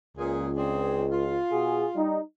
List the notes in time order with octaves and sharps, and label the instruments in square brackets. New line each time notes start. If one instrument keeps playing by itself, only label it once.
[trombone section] C#2 [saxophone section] A#2 G#4
[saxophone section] C4 D4 G#4
F4
[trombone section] B2 F#4 G#4
G3 D#4